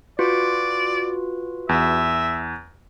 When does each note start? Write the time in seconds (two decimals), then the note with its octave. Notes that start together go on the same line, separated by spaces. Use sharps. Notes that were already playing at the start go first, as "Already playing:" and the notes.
0.19 F4 F#4 B4 D5
1.69 E2 E5